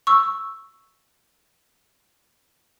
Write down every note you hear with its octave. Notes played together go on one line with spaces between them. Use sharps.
C#6 E6